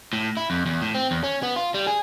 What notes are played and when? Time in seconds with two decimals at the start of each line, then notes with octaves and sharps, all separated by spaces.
0.13 A2
0.37 E4
0.50 F2
0.66 E2
0.82 A2
0.94 C4
1.11 E2
1.24 C#4
1.43 B3
1.56 F4
1.74 G3
1.87 G#4